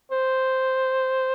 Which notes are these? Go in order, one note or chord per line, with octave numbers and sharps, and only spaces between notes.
C5